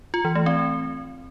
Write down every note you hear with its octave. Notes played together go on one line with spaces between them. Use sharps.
F4
E3
A3
C4